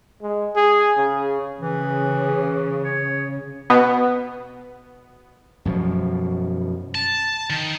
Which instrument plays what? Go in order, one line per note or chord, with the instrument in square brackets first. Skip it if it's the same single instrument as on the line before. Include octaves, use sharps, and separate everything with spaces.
[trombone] G#3
G#4
C#3
[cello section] C#3 [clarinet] E3
[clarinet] C#5
[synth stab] B2 B3
[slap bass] F#2 B2 F3
[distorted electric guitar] A5
D#3